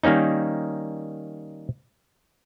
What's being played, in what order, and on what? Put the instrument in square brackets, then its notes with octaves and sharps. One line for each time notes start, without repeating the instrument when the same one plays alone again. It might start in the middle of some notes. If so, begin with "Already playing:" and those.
[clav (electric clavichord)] D#3 G3 A#3 C#4 D#4